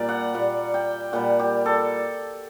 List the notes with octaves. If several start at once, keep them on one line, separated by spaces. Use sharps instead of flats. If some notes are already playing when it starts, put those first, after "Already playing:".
Already playing: A#2 G3 A#4 D5
F#5
A#2 G3 F#5
G5
A#2 G3 F#5
G4
A4